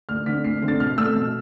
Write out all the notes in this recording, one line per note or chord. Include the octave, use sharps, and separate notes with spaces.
D2 F6
D3 A3 C4 B6
D2 C7
D3 A3 C4
A6
B2 F6
A3 C4 E6
B2